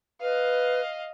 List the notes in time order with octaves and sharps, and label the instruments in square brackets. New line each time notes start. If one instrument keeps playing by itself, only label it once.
[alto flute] B4 [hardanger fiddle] D#5 F5